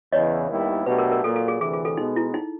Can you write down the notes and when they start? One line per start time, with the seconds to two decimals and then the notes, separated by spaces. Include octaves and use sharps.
0.12 E2 C#3 E3 C#5 D#5
0.50 D#2 D#3 G3 B3 E4
0.86 B2 F#3 A3 D4 G4 B4
0.98 A#4
1.11 A#4
1.24 A#2 F#3 A#3 A4
1.36 A4
1.48 G#4
1.60 D2 C3 E3 G#4
1.73 G#4
1.85 A4
1.97 B2 G#3 B3 D#4
2.16 E4
2.34 D#4